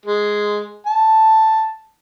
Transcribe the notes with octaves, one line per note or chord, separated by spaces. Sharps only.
G#3
A5